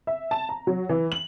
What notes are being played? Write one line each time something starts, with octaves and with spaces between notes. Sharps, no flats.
E5
A5
A#5
F#3
E3
F#7